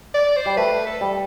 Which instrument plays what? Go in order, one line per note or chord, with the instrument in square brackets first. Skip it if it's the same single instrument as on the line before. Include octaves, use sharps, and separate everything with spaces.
[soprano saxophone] D5
C5
[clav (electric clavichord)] G3
[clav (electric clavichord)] A3 [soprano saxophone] B4
[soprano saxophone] A4
[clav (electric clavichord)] G3